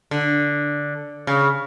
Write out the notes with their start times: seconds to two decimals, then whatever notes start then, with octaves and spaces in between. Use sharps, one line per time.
0.11 D3
1.27 C#3